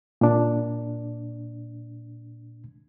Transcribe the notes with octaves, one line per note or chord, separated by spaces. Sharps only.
A#2 D4